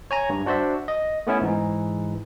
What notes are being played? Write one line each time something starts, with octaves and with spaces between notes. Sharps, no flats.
C#5 G#5 A#5
G2
D4 F#4 C5 D5 E5
D#5
A3 B3 C#4 E4
G#2 E3 D#4